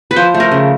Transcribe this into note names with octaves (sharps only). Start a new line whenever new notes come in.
B4
F3 C5
A3
A#4
C#3